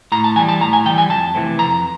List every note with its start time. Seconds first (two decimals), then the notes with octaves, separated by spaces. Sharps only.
0.12 A2 A#5
0.24 A5
0.36 E3 G#5
0.39 G3
0.49 A5
0.61 A2 A#5
0.73 G#5
0.86 E3 G5
0.88 G3
0.98 G#5
1.10 F2 A5
1.35 C3 E3 A3 C4
1.59 F2 A#5